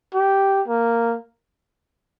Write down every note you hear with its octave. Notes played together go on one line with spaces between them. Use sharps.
G4
A#3